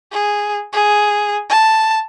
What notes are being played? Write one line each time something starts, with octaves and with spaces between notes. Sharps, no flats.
G#4
G#4
A5